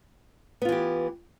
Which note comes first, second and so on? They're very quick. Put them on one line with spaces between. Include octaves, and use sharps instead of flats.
B3 F4 E3 G4